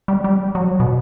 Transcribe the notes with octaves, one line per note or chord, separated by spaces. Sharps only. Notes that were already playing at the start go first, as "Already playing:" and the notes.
G3
G3
F#3
B2